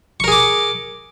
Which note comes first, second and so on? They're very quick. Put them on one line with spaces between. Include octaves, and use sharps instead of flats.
C#6 A#4 G#4 D6